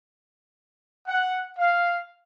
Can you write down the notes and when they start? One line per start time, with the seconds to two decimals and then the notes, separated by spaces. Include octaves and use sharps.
1.06 F#5
1.57 F5